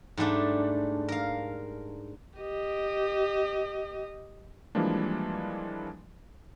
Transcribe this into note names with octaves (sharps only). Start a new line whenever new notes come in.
G#2 G3 A3 D4
A#4 F5
G4 D#5
E3 F3 G3 G#3 A#3 D4